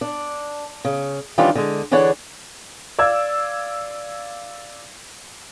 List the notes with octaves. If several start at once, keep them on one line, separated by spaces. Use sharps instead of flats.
D4
C#3
D#3 E3 G3 C#4 D4 F4
D3 G#3
D3 E3 D4 G#4 C#5 F#5
D5 F5 E6 G#6